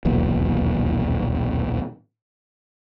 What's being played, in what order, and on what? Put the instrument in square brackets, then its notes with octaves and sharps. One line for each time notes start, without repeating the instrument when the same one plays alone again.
[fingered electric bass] D#1 B1 E2 A#2